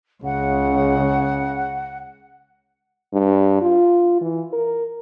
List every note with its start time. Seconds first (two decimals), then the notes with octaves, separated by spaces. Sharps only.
0.24 C#2 C#3 F#5
3.13 G2
3.61 F4
4.21 E3
4.53 A#4